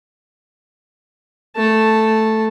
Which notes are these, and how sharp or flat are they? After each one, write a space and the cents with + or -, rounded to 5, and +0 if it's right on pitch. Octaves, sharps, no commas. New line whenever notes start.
A3 +0 A5 +0